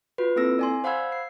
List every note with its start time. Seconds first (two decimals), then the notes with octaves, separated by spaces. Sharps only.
0.18 F4 F#4 B4
0.36 A#3 C4 E4 A4 E6 A#6
0.59 D5 G#5 C6
0.84 C5 F5 F#5 B5 E6 G#6
1.12 C7